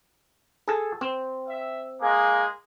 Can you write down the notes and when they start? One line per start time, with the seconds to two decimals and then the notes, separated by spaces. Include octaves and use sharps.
0.68 G#4 A4
1.01 C4
1.47 E5
2.01 G#3 A#3 G#4